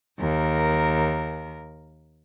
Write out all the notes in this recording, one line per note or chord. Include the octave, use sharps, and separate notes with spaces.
D#2 A#4